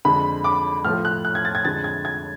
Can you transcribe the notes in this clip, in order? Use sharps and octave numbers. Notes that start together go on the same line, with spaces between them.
F2 D3 G#3 B5
D6
A2 F3 A3 F6
F#6
F#6
G#6
A6
G#6
F2 D3 G#3 A6
G#6
G#6